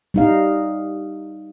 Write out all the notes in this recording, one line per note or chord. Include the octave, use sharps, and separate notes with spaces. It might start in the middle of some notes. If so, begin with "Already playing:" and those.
G3 D#4 F5